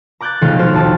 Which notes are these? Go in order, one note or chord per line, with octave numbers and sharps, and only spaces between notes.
A#5 D6 F#6 G6 A6
B1 D#3 F3 G#3 F5 C#7
F#4 C5 C#5 F6
A#1 D#2 A5